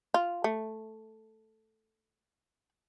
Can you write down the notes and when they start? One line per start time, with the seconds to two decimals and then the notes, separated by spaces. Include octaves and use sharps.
0.14 F4
0.44 A3